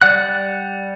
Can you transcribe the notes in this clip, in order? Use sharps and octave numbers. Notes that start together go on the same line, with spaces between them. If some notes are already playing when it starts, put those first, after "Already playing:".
G3 D5 F#5 F#6